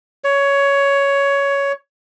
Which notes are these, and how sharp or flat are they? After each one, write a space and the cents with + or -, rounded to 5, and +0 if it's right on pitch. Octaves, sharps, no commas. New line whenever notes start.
C#5 +15